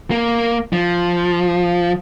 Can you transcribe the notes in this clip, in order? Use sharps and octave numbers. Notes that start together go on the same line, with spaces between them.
A#3
F3